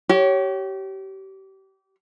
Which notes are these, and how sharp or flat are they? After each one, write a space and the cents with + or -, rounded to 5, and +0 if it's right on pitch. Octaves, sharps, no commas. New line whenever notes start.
G4 -30 C#5 +0